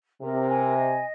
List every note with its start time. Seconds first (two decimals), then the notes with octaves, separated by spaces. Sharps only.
0.22 C3 A#4
0.49 G#5
0.76 D#5